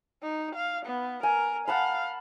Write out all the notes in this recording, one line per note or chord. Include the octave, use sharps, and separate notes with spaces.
D#4
F5
B3
A#4 G#5
F5 F#5 A5 B5